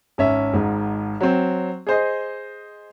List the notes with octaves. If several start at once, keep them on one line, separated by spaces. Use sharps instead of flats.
G#1 C#4 E5
G#1 G#2
F#3 C4
G#4 C5 D#5